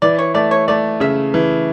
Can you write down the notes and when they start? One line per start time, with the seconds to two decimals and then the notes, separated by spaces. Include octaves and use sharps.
0.02 E3 D5
0.19 C#5
0.34 A3 D5
0.51 C#5
0.68 A3 D5
1.00 C#3 E5
1.34 E3